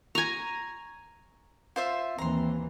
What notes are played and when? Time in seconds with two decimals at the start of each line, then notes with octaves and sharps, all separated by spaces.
0.15 G#5 A#5 C#6
1.76 F4 C5 E5
2.18 D#2 E3 C4 A#5 C6